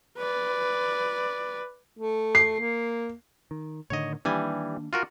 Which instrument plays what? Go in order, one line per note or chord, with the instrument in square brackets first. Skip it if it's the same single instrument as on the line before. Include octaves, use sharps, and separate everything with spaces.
[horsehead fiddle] B4 D5
[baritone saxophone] A3
[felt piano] C7
[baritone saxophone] A#3
[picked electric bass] D#3
[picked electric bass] A2 D3 D#3 [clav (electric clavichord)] C#5 D#5
[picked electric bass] D#3 A#3 D4 [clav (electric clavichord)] E3 G3 G#5
[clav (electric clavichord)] F4 F#4 A#4